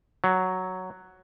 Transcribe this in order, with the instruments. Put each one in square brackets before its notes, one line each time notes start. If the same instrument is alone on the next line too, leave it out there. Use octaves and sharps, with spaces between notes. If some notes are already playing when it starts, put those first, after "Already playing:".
[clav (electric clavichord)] F#3